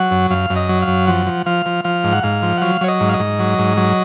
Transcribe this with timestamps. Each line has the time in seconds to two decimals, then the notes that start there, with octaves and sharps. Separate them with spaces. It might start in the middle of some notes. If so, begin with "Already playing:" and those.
Already playing: F#3 F#5
0.11 F#2
0.31 F#2 F5
0.50 F#2
0.56 D#5
0.69 F#3
0.82 F5
0.88 F#2
1.07 F3 F#5
1.27 F3
1.46 F3 F5
1.66 F3
1.84 F3 F5
2.04 G#2
2.13 F#5
2.23 G#2 F5
2.42 F3
2.57 F#5
2.61 F#3 F5
2.81 F#3 C#5
2.88 D#5
3.00 G#2
3.09 F5
3.14 D#5
3.19 G#2
3.39 F#3
3.59 G#2
3.77 F#3